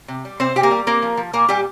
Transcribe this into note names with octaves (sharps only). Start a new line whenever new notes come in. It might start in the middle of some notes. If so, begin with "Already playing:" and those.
C3
G3
C3 C4 C5
C3 G4
A#3 A#4
G3
A#3 C4 A#4
F3
F3
A#2 A#3 A#4
A#2 G3 G4